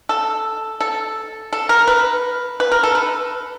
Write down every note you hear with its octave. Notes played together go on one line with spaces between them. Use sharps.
A4
A4
A4
A#4
B4
B4
A#4
A4
B4